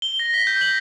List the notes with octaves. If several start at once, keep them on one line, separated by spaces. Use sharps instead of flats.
G7
A#6
B6
G6
F#7